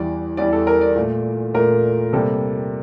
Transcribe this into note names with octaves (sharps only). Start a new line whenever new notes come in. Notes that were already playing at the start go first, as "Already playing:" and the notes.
Already playing: E2 E3 G3 D5
E2 E3 G3 D5
A4
A#4
D5
A#2 A3
A#2 A3 A#4
C3 G3 A#3 A4